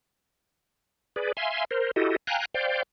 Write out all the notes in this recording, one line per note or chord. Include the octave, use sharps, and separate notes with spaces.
G#4 B4 D5
E5 F5 G#5 C6
A#4 C5
E4 F#4 G4 A4 D#5
F5 G5 G#5 A#5 F#6
C5 D5 F5 G5